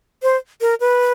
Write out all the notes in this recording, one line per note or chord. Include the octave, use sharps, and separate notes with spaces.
C5
A#4
B4